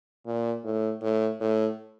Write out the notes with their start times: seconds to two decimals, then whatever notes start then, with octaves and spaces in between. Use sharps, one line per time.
0.26 A#2
0.64 A2
1.02 A2
1.40 A2